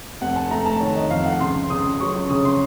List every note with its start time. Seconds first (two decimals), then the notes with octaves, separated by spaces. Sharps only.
0.21 F1 F#5
0.36 A5
0.50 A3 A#5
0.66 A5
0.80 D#3 C#5
0.96 D#5
1.10 F2 F5
1.26 F#5
1.40 C#2 C6
1.70 C#2 D#6
2.00 F#3 C#6
2.14 C#6
2.30 C#3 D#6
2.45 C6